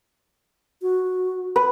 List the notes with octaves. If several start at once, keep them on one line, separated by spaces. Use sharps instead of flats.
F#4
B4